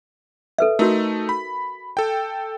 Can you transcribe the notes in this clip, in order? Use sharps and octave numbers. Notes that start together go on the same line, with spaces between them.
A4 B4 E5
A3 D#4 F#4 A#4
B5
A4 G5